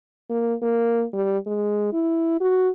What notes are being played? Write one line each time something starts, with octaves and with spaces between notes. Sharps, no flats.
A#3
A#3
G3
G#3
E4
F#4